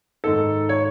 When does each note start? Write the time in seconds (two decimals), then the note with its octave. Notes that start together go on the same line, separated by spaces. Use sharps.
0.24 G#2 D#3 A4
0.69 C#5